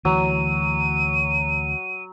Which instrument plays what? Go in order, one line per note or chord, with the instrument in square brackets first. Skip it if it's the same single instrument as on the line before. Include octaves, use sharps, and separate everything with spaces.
[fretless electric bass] D2 E3 [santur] F#3 [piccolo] D#7